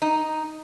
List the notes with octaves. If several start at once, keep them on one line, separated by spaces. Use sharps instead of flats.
D#4